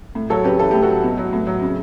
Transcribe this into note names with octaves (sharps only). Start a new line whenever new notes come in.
A2
F#3 A4 C#5
C#3 G4 B4
E3 A4
A2 G4
F#4 A4
F#3
B2
F#3
A2
F#3
C#3